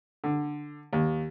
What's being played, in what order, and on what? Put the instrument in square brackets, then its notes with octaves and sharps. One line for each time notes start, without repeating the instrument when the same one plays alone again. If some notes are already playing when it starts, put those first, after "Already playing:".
[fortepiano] D3
D#2